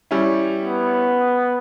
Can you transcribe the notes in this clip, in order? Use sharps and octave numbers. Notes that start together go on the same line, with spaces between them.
G3 C#4 E4
B3